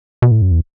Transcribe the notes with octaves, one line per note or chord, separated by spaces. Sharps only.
B2
A2
F#2
E2